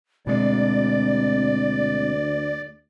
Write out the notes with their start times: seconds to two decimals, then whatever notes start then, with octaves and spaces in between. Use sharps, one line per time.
0.27 D2 B2 G#3 C4 D5